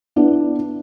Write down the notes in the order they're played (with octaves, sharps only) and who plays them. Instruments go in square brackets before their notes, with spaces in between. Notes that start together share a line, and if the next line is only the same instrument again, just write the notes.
[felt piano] B3 D4 E4